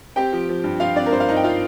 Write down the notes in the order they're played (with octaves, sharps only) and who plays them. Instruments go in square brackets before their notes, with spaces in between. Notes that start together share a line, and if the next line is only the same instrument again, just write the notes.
[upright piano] C4 G4 G5
F3
F3
G2
F3 F4 F5
C4 D4 D5
A#4
G2 C5
F5
G2 D#4 D#5
G5
F4 F5